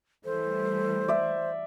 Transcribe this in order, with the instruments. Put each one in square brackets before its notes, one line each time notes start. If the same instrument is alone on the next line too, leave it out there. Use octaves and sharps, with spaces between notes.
[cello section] E3 G3 A3 [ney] A4 [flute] C5
[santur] D5 E5